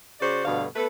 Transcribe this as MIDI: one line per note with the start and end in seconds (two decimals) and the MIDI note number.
0.20 0.42 49
0.20 0.42 66
0.20 0.42 72
0.20 0.42 74
0.45 0.65 38
0.45 0.65 43
0.45 0.65 47
0.45 0.65 50
0.45 0.65 69
0.45 0.65 77
0.76 0.87 57
0.76 0.87 59
0.76 0.87 69
0.76 0.87 71